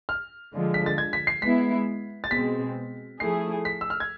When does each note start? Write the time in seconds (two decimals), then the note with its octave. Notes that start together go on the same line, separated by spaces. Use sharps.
0.09 F6
0.53 D3 F3 G#3
0.74 B6
0.86 A6
0.98 G#6
1.13 B6
1.27 C7
1.42 G#3 B3 E4 B6
2.24 A6
2.31 B2 G#3 C4 B6
3.20 F3 A3 E4 G#4 C7
3.65 B6
3.81 E6
3.90 F6
4.00 G#6